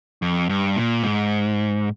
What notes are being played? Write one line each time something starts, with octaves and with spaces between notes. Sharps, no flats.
F2
G2
A#2
G#2